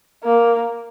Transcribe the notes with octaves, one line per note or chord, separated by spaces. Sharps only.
A#3